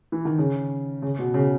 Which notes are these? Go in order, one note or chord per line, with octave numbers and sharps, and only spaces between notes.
E3
D#3
C#3
C#3
B2
C#3